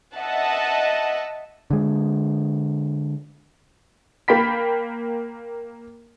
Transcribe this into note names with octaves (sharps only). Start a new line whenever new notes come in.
D#5 E5 F#5 A5
D3 G#3
A#3 G5 B5 B6